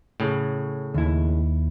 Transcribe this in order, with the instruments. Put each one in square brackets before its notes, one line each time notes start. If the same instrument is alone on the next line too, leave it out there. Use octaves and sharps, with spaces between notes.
[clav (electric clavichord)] A2 C#3
[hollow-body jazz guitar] D#2 E4